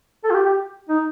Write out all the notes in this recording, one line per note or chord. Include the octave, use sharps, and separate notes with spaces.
A4
F4
G4
G4
D#4